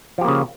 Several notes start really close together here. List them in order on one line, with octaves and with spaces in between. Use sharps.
F3 G4 A#3 C#3